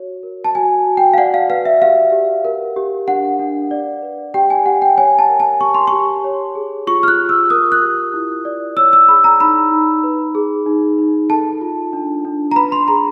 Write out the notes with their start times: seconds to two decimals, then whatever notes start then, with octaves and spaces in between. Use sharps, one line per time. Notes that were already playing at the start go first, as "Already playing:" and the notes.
Already playing: F#4 C#5
0.23 A#4
0.44 A5
0.55 F#4 G#5
0.86 F#4
0.97 G5
1.14 F5
1.18 D5 F#5
1.34 F5
1.49 B4 F5
1.65 E5
1.82 G4 F5
2.12 G4
2.45 A#4
2.76 G4
3.08 D4 F#5
3.39 D4
3.71 D5
4.03 B4
4.34 G4 G5
4.50 G#5
4.66 G4 F#5
4.82 G5
4.97 C#5 G#5
5.19 A5
5.29 A#4
5.40 A5
5.61 G4 C#6
5.74 C6
5.87 C#6
5.92 G4
6.24 C#5
6.55 G#4
6.87 F4 C#6
7.03 F6
7.08 F#6
7.19 F4
7.29 E6
7.50 A#4 D#6
7.72 F#6
7.82 G4
8.14 E4
8.45 D5
8.77 C#5 E6
8.93 E6
9.08 G#4 B5
9.24 A#5
9.40 D#4 B5
9.71 D#4
10.03 B4
10.35 G#4
10.66 D#4
10.98 D#4
11.30 A4 A5
11.61 F4
11.93 D4
12.25 D4
12.51 A#5
12.56 B4 B5
12.72 C6
12.88 G#4 A#5